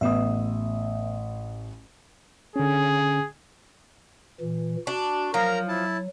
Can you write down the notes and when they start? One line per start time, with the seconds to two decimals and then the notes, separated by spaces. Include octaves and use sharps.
0.01 A1 B3 E5 D#6
2.56 D3 C#4 G#4
4.41 A#2 E3
4.87 D4 F#4
5.34 F3 F#3 A#4 A#5
5.69 E4 A5